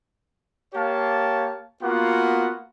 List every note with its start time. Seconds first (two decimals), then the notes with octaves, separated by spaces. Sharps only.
0.74 A#3 G4 C#5 F5 A5
1.82 A#3 B3 F4 F#4 F#5